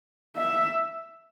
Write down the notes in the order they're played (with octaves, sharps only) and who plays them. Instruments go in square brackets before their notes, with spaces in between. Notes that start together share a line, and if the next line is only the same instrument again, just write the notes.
[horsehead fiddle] E5